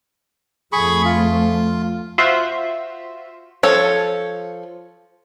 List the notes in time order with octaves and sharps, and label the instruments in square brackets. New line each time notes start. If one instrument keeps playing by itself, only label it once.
[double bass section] F2 F3 A3 [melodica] G#4 B5 C#6
[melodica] F4
[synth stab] F4 F#4 C5 E5
[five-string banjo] F3 A4 C#5